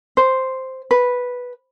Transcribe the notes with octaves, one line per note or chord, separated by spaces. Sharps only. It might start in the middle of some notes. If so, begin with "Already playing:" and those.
C5
B4